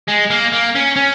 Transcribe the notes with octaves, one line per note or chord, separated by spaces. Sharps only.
G#3
A#3
A#3
C#4
C#4